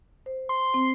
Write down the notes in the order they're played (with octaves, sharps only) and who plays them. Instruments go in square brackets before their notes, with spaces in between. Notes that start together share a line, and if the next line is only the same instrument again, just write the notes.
[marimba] C5
[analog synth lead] C6
[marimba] C4